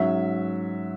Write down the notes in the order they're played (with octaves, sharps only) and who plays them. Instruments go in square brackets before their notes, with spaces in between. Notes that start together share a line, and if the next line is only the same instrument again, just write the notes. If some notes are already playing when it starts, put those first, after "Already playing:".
Already playing: [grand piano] G#2 F#3 C#4 E5